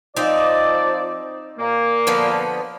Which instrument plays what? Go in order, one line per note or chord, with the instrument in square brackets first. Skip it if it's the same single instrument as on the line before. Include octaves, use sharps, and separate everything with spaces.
[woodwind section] F3 D5 [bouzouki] C4 D#4
[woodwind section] A#2 A#3
[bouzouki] D3 F3 B3